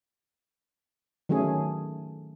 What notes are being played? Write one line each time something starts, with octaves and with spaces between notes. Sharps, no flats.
D#3 F#3 A3 C#4 G#4